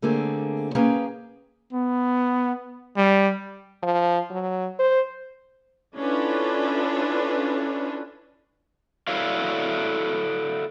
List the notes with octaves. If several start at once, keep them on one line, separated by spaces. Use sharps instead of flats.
D3 A3 A#3 C4 G#4
A#3 C#4 G#4 B4 G5 A#5
B3
G3
F3
F#3
C5
C#4 D4 E4 F4 A4 B4
E4 F#4 A4 C#5 D5 F5